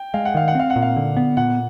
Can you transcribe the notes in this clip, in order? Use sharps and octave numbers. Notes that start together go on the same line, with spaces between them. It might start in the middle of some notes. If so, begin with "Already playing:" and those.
Already playing: G5
G#3 F5
F#5
D#3 F5
F#5
C4 F5
F#5
A#2
F5
D3
B3
A#2 F#5